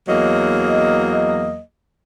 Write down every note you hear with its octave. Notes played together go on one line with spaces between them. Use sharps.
E2 F#3 A#3 D#5